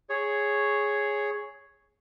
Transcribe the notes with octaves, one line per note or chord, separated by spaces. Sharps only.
G#4 C#5